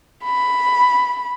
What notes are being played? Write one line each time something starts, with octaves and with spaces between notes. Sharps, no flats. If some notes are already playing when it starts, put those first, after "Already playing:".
B5